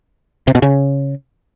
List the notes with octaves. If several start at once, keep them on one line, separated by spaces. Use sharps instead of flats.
C3
B2
C#3